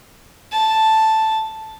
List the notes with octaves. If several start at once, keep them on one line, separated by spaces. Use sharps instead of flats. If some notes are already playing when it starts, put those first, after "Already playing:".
A5